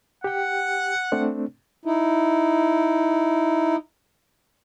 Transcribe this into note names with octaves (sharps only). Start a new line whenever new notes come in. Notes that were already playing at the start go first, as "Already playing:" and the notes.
G4 F#5 G5
A3 C4 D4
D#4 E4